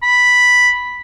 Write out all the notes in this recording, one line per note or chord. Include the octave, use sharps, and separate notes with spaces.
B5